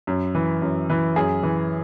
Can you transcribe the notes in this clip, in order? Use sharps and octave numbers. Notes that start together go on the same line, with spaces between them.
F#2
E3
F#2
E3
F#2 G#4
E3